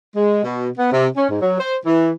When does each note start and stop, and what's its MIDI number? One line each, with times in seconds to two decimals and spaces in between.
0.15 0.41 56
0.43 0.67 47
0.78 0.91 59
0.91 1.06 48
1.15 1.25 61
1.29 1.37 44
1.40 1.56 54
1.59 1.75 72
1.84 2.11 52